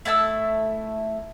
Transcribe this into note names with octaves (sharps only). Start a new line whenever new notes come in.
A3 E4 A5 E6